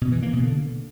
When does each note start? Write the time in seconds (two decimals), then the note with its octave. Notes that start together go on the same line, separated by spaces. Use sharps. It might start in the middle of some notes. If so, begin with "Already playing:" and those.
0.01 B2
0.12 E3
0.23 A#3
0.33 B2
0.44 D3